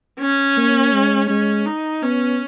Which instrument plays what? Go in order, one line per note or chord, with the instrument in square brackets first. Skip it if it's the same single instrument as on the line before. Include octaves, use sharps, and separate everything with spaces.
[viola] C#4
[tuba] A#3
G#3
[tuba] G#3 [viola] C#4
[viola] D#4
[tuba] B3 [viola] C#4